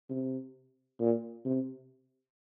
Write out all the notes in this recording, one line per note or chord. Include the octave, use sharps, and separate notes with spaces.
C3
A#2
C3